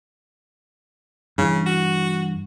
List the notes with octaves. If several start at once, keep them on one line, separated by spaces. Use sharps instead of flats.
G2 C#3 E3
F#4